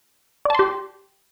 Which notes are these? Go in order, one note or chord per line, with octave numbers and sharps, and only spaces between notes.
G4 D5 A5 C6